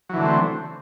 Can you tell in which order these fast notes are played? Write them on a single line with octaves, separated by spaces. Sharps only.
F#3 E3 D3 A3 C4